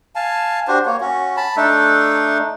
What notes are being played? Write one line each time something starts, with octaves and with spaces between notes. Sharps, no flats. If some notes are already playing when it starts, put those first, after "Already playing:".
F5 G#5 A5
D4 F#4 G4 C5
A#3 C#5
C#4 F#4
A5 B5
A3 D4 D#4 A4